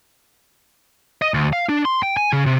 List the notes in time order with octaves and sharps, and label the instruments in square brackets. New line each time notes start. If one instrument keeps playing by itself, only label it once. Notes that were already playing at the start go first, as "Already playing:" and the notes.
[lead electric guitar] D#5
D2
F5
D4
C6
G5
G#5
C#3
C3